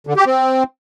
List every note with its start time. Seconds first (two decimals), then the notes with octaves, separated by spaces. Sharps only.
0.07 D3
0.16 G4
0.26 C4